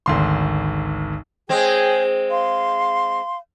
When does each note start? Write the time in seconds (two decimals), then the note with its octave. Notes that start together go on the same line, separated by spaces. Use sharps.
0.06 G#1 D2 C6
1.49 G#3 C4 G#4 C#5 G5
2.31 F5 C6